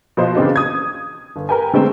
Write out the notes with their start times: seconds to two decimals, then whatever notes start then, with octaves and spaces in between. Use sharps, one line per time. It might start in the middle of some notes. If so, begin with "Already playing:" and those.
0.17 B2 F3 C5 D#5
0.35 C#3 E3 C4 D4 D#4
0.56 D#6 G#6
1.36 G1
1.49 A#4 B4 G5 G#5
1.73 D3 G#3 A3 C4